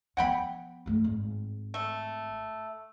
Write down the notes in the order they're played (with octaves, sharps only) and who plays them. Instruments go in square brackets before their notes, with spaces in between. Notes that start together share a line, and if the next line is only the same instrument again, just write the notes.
[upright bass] F3 B3 [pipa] F#5 G5 B5
[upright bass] F#1 A3
G#1
[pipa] A3